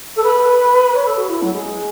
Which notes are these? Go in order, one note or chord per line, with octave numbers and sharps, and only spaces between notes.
A4
B4
C#5
A4
F#4
E4
F#3
G#3